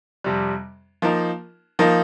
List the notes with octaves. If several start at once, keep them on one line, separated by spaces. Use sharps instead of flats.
F2 C3 G3
F3 A#3 D#4 A#4
F3 A#3 D#4 A#4